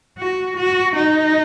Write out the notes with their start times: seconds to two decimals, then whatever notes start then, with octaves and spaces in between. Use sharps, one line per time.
0.18 F#4
0.57 F#4
0.95 D#4